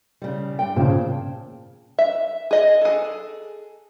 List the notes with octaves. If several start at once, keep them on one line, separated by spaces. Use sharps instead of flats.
C#3 G3
G2 G5
A#2 C#3 C5 A5
E5
G#4 D#5
G#4 A4